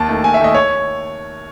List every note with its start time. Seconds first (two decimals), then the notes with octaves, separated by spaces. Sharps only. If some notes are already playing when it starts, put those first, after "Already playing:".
Already playing: D#2 A5
0.09 D#3 A3
0.24 D#2 G#5
0.34 E5
0.39 D#3 A3 D#5
0.54 C#5